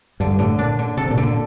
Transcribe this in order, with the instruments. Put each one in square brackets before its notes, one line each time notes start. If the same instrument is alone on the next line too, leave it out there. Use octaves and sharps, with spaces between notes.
[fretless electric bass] G2 [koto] D3
[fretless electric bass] A2 [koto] D3
[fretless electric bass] A#2 [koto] D4
[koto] D3
[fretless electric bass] C3 [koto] A4
[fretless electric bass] A#2
[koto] D3
[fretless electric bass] A#2